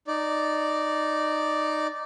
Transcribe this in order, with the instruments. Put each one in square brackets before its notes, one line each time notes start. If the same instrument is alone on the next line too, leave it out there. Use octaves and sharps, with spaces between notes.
[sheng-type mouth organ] D#4 D5